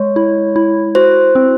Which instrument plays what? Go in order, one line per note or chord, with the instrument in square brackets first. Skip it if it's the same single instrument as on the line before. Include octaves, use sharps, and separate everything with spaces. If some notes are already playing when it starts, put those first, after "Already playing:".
Already playing: [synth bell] G#3 [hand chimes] C#5
[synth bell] E4
E4
[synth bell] F#4 [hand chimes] C5
[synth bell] C4